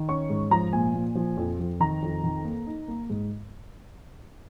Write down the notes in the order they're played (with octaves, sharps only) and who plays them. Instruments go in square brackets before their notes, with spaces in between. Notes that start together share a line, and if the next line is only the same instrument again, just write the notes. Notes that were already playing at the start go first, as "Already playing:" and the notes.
Already playing: [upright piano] D#3
C#4 C#6
G#2
F3 A#5
A#2 G#5
A#2
F3
F2
F2
D#3 A#5
F2
D#3
A#3
D#4
A#3
G#2